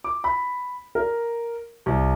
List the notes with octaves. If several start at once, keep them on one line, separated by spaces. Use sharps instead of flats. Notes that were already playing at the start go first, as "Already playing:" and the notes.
D6
B5
A#4
C2